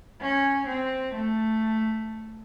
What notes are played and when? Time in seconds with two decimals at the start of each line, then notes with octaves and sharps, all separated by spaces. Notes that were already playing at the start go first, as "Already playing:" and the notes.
0.21 C#4
0.68 C4
1.14 A3